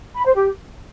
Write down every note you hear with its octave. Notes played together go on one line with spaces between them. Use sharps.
B5
C5
G4